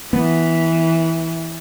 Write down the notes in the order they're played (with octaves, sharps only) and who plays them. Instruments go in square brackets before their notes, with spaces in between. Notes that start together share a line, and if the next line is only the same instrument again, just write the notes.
[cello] E3 [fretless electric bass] B3